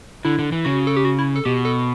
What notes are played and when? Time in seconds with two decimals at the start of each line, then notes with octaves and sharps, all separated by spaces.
0.25 D3 E4
0.39 D3
0.52 E3
0.65 C#3 F#4
0.87 A4
0.97 G4
1.05 F#4
1.19 E4
1.36 A4
1.45 B2 G4
1.65 A4